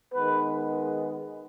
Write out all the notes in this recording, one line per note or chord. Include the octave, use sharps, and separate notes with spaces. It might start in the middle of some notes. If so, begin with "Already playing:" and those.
D#3 G#3 B3 B4